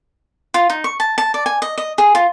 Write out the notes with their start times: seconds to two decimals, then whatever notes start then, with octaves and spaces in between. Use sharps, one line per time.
0.54 F4
0.70 D#4
0.84 C#6
1.00 A5
1.18 A5
1.34 D5
1.46 G#5
1.62 D#5
1.78 D#5
1.98 G#4
2.15 F4